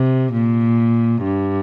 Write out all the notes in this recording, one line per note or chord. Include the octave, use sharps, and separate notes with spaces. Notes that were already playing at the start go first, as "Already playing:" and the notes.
Already playing: C3
A#2
G2